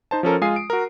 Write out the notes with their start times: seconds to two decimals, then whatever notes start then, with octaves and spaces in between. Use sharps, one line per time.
0.11 D#4 C5 A5
0.23 F3 C#4 A4 A#4
0.41 G#3 F4 G#5 D#6 C7
0.56 D7
0.70 F#4 A#4